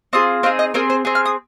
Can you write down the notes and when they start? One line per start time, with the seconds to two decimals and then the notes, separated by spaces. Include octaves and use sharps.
0.13 C4 F4 G#4 D#6
0.43 C4 D#4 G#4 F5
0.59 D#5
0.74 C4 G#4 A#4
0.90 C5
1.05 C4 G#4
1.15 F6
1.25 D#6